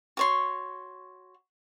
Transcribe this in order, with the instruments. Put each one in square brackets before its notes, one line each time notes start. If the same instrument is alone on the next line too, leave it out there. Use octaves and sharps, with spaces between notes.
[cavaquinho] F#4 C#5 C6